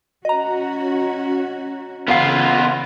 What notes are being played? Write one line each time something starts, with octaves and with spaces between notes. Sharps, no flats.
C#4 F#4 D#5 A#5
C#3 E3 B3 F4 F5 F#5 C7